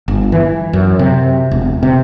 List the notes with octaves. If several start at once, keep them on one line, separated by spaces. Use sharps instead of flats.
G1
E3
F#2
C3
E1
C3